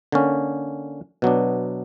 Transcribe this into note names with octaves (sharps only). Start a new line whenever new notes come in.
D3 A#3 C#4
B2 F#3 B3 D4